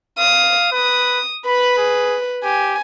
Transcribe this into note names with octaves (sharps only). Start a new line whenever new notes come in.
F5 D#6
B4 D#6
B4 B5
G#4
G4 G#5